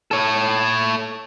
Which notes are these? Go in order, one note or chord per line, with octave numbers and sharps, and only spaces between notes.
A4 C#5